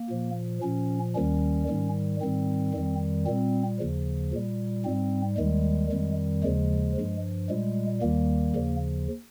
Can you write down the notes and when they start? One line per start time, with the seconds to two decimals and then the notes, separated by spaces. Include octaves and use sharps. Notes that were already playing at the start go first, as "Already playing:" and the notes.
Already playing: A#3
0.10 A#2 F3
0.62 A#2 F3 C#4
1.15 D#2 D#3 G3 C#4
1.68 G#2 D#3 G3
2.20 G#2 D#3 G3 C4
2.74 F2 D#3 G3
3.26 A#2 G3 C4
3.79 D#2 C#3 F3
4.33 A#2 G3
4.85 G#2 G3 C4
5.38 D#2 D#3 G3 G#3
5.91 F2 D#3 G3
6.43 D#2 C#3 F3 G#3
6.96 G2 F3
7.49 A#2 G3 G#3
8.02 D#2 D#3 G3 A#3
8.55 D#2 C#3 F3